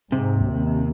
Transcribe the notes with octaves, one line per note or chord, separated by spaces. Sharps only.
G#2 C3
D#2